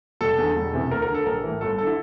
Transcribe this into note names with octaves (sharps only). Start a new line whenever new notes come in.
F1 A4
E2 D3
E1
E2 C3 E3
D2 A#4
A#4
D3
A4
A#1 A#4
A2 E3
G1 A4
D3 A4
E4